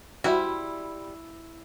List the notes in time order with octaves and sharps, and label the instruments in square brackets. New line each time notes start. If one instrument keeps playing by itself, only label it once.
[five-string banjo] G3 C5 E5 [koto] E4 [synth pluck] F#4